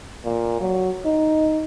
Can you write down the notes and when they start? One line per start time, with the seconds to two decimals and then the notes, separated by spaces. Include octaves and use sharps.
0.24 A#2
0.61 F#3
1.05 D#4